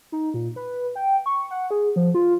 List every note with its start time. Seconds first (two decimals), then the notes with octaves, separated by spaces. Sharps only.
0.12 D#4
0.34 A#2
0.56 B4
0.95 G5
1.26 C#6
1.51 F#5
1.71 G#4
1.96 F3
2.14 F4